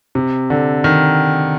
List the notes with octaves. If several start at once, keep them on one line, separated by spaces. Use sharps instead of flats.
C3
D3
D#3